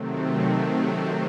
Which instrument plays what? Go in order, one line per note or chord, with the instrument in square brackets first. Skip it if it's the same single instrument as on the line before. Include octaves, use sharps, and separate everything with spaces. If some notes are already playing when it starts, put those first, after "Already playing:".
Already playing: [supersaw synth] C3 D#3 F#3 A3 C4